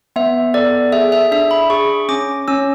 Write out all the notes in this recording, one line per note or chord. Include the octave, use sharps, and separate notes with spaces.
B3 E5
A4 D5
G#4 E5
E5
D4 E5
B5
G#4 C#6
C#4 D6
C#4 E6